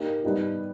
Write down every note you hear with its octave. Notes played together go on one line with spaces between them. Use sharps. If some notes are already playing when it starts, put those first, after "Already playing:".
Already playing: A#3 D#4 G4
G3 B3 D#4 G4